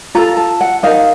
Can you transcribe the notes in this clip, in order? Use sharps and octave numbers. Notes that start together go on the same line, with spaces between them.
F4 A4 A#5
A5
F#5
D#4 A#4 F5